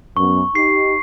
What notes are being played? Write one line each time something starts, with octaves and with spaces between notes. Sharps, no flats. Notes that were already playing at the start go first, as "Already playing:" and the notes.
F#2 B3 C#6
D#4 G4 C7